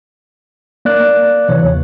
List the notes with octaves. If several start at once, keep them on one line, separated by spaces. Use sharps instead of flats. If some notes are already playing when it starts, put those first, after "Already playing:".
A#3 D5 F#6
C3 E3 C#5
D#2